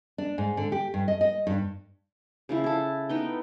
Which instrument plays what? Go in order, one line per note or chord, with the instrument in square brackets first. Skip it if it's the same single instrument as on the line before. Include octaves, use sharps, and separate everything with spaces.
[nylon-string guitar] D4
G#2
D3
G4
G2
D#5
D#5
G2
[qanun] C#3 F3 E4
E4 A4
B3 D#4 G5